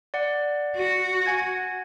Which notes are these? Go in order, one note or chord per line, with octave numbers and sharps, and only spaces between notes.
D5 F#5
F#4
F#5 G#5 G#6